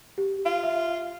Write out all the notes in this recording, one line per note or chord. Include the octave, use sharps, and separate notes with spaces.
G4
F4 F5
E5